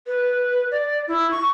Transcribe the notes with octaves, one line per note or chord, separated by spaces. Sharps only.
B4
D5
E4
C#6